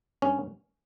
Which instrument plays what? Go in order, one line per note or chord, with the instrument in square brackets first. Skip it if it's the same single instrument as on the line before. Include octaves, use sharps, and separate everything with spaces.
[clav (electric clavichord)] G2 C#4